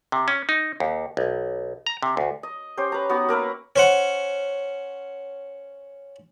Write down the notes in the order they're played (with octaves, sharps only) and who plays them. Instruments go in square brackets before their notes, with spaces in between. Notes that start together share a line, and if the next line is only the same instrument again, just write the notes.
[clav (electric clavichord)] C3
C#4
D#4
D#2
B1
A#5
C3
D2
[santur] D#5
C#4 G4 C5
B4 A#5
B3 D#4 F#4
A#3 A#4 B4 E5
[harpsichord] C#4 C5 F#5